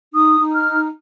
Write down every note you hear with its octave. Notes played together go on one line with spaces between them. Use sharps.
D#4 D#6
D#4
F6